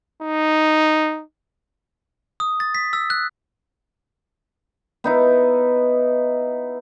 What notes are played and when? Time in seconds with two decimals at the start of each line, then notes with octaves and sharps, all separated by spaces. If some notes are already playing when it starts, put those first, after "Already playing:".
0.22 D#4
2.40 D#6
2.60 A6
2.75 B6
2.93 E6
3.10 F#6
5.04 B3 D#4 E4